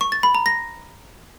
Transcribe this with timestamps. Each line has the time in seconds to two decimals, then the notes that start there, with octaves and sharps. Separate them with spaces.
0.01 C#6
0.12 A6
0.23 B5
0.35 A#5
0.46 A#6